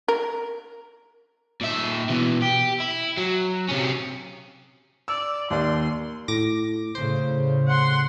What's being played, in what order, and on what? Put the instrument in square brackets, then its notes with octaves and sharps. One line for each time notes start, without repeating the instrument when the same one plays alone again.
[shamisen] A#4
[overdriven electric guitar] A#2 E5
B2 E3
G4
E4
F#3
C3 C#4
[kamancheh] D5 [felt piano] E6
[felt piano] D#2 D5 [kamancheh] C6
[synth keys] A2 D6 A#6
[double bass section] A2 C#3 [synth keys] C5
[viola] F#5 C6